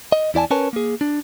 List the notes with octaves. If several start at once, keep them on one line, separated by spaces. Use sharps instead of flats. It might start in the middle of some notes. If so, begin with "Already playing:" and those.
D#5
E2 E4 D5 G#5 A5
C#4 A#4 B4 C#5 G#5 A5
A#3 G#4
D4